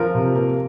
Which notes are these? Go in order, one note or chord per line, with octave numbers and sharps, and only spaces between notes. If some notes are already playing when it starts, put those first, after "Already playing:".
Already playing: F3 A#4
C3
A#3